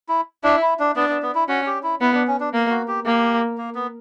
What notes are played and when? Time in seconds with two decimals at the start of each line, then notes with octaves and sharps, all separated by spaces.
0.09 E4
0.44 D4 E4
0.62 E4
0.79 D4
0.96 B3 D4
1.10 B3
1.22 B3
1.35 E4
1.48 C#4 F#4
1.67 G4
1.83 E4
2.01 B3 E4
2.14 D4
2.27 C#4
2.40 D4
2.53 A#3
2.70 F#4
2.88 G4
3.05 A#3 G4
3.58 A#3
3.75 B3